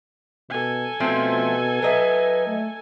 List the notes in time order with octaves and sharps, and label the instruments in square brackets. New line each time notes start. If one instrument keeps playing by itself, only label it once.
[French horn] B2 [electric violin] A4 G#5
[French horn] B2 [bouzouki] F3 A3 C4
[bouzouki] F#3 D#5 E5 [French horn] B4
[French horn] A3